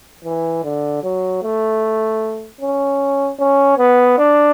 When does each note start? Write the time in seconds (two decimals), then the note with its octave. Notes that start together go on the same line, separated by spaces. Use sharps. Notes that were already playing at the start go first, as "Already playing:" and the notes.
0.25 E3
0.64 D3
1.03 F#3
1.43 A3
2.61 C#4
3.39 C#4
3.78 B3
4.18 D4